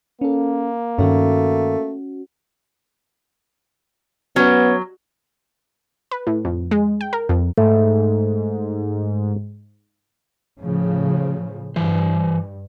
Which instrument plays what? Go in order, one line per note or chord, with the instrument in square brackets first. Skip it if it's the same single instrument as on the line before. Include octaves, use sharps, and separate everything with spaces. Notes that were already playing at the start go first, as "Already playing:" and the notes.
[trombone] A#3 [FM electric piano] C#4 A4
[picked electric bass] G2 D#3 [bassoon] A3 [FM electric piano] C#4 F#4
[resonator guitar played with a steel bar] F#3 [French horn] B3 [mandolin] C#4
[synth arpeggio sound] B4
A2
F2
G#3
G5
A#4
F2
[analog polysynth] G#2 [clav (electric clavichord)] A3
[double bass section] A2 C#3 F3
[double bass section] G2 [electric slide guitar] E3 C5